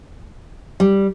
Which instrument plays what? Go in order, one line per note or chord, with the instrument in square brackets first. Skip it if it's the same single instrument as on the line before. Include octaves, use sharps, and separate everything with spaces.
[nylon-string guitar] G3